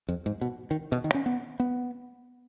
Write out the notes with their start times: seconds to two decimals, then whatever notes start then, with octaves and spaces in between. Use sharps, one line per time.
0.08 F2
0.26 G#2
0.41 B2
0.71 D#3
0.92 B2
1.04 D#3
1.14 C#4
1.26 B3
1.60 B3